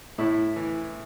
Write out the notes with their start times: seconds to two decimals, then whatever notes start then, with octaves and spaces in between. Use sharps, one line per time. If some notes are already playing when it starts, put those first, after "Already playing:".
0.18 A2 E4
0.56 E3